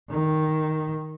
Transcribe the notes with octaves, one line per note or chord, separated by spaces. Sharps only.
D#3